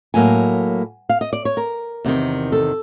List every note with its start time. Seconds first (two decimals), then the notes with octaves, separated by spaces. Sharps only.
0.14 A2 F#3 A#3 G#5
1.09 F5
1.21 D#5
1.33 D5
1.45 C#5
1.57 A#4
2.05 E2 C3 D#3
2.52 A4